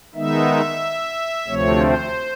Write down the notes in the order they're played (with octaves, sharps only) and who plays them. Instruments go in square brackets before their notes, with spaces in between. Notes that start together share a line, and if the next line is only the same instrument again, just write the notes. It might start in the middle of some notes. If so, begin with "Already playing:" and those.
[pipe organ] D#3 G#3 B3 D#4 E5
D2 C3 F3 A3 C4 C#5
C5